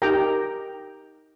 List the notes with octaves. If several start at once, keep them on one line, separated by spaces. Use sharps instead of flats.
D#4 G4 A#4 G5 A#5